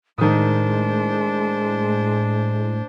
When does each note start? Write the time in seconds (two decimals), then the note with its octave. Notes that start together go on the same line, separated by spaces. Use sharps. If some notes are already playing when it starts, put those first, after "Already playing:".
0.18 A2 D#3 G#3 D4 C5 D#6